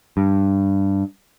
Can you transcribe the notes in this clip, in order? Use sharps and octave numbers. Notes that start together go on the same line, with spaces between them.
G2